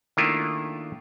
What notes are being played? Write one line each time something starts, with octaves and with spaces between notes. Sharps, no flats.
D#3 A3 A#3 D4 E4 F4